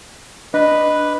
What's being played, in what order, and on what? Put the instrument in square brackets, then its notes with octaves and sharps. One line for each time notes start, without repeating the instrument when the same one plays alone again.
[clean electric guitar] D4 D#5 [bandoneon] B4